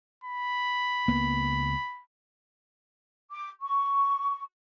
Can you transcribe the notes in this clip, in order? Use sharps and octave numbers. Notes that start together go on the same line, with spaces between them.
B5
C#2 A#3 B3
D6
C#6